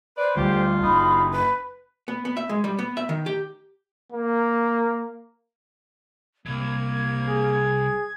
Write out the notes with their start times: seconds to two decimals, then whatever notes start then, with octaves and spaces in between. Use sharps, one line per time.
0.17 B4 C5 D5
0.37 D2 D3 G3 F4 G4
0.83 F#1 D#4 B5
1.31 B4
2.08 B3
2.25 B3
2.37 E5
2.49 G#3
2.64 G3
2.79 B3
2.97 E5
3.09 D#3
3.26 G4
4.12 A#3
6.46 C2 A#3 G#6
7.29 G#4